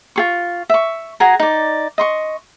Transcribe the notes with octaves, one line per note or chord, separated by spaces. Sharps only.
F4 G#4 C#6
E5 C#6
F#4 G#4 G#5 A#5
D#4 D5
D#5 C6 C#6